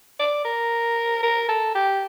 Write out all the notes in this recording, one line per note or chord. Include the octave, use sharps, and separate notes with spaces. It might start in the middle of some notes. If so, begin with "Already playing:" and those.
D5
A#4
A#4
A4
G4